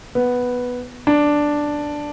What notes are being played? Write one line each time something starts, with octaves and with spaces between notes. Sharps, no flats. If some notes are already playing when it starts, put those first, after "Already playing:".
B3
D4